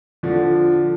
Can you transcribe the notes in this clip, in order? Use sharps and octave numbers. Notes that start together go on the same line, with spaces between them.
D3 F3